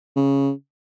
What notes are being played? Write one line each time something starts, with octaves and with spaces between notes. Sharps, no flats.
C#3